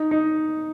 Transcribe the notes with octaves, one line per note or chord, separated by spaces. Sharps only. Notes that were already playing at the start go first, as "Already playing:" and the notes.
Already playing: D#4
D#4